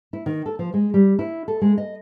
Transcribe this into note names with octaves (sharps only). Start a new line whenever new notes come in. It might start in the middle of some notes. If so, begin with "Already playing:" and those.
E4
D#3
A4
F3
G#3
G3
E4
A4
G#3
D#5